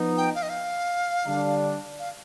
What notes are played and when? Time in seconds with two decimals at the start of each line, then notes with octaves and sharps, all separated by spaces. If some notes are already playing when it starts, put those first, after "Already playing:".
Already playing: F3 B3 D#4
0.17 G5
0.35 F5
0.42 D#5
0.49 F5
1.26 D3 G3 D4
1.99 F5